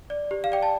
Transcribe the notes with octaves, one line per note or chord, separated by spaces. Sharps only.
D5
G4
F5
D5 G5
A5